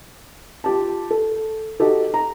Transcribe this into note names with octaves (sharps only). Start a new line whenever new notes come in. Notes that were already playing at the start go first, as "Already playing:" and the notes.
F4 G4 A5
A4
D#4 F#4 G4 A4
A#5